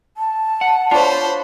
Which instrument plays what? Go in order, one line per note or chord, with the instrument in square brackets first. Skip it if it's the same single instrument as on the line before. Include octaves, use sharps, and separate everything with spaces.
[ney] A5
[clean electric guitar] F#5
[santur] D4 C#5 [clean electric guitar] F4 [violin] C5 B5